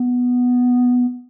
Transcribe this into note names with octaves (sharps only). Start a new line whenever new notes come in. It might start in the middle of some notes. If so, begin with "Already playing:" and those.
Already playing: B3